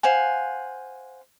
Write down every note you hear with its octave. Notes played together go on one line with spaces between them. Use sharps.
C5 F5 F#5 G#5